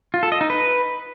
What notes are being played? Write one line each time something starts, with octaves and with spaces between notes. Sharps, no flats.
F4
A4
D#5
D#4
B4